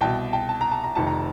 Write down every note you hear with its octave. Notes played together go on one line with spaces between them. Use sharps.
C2 B2 G5 A5
G5 A5
A5
A#5
A5
A#5
F1 F2 C3 D#3 A5
A#5